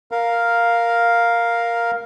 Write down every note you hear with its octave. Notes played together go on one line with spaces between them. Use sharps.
A#4 F5